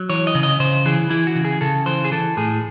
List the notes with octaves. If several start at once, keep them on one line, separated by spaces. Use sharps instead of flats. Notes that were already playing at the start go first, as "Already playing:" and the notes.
Already playing: F#3
E3 C#5
D#5
C#3
D#5
C#3 C5
E3 G#4
E3 E4
F#4
C#3
G#4
C#3 A4
E3 C5
G#4
E3 A4
A2 G#4